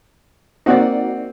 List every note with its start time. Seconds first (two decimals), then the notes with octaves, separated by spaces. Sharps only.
0.66 A#3 C4 D#4 F#4 D5 F#5